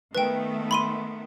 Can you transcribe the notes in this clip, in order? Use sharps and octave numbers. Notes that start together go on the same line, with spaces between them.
D#3 A3 B3 B4 G5
B5 C6 D#7